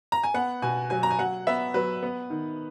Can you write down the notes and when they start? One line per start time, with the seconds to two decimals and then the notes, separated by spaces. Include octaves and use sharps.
0.12 A#5
0.23 G#5
0.34 B3 F#5
0.62 B2 G#5
0.90 F#3 G#5
1.03 A#5
1.11 G#5
1.18 F#3 F#5
1.47 B3 E5
1.74 F#3 B4
2.03 B3
2.30 D#3